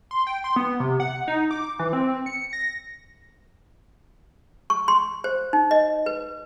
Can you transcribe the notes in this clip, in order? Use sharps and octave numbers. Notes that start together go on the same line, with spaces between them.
C6
G5
C6
B3
C3
F#5
D#4
D6
E3
C4
C#7
A#6
C#6
C6
C5
D#4
D#5
B4